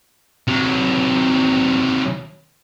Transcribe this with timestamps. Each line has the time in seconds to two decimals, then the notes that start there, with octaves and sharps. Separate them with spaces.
0.47 C3 F#3